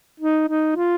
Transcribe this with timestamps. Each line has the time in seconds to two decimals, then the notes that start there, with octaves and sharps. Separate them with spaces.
0.20 D#4
0.48 D#4
0.76 F4